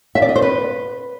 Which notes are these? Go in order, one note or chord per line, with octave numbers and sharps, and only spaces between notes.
E5
D5
D#5
C5
B4